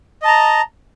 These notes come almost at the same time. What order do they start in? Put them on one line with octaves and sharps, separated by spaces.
D#5 A5 A#5